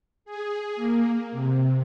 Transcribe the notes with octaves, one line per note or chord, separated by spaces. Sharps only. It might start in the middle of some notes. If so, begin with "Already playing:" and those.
G#4
A#3
C3